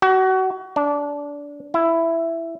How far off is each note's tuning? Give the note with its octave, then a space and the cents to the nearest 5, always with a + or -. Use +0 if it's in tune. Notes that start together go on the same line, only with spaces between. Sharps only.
F#4 +30
D4 -20
E4 +10